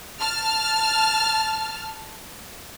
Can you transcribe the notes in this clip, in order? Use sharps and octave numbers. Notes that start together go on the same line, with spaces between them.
A5 F6